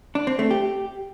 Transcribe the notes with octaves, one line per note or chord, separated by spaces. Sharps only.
D4
C4
A3
G4